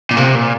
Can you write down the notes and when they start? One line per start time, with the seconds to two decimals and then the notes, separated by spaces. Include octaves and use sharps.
0.11 A#2
0.17 C3 A#3
0.35 A#2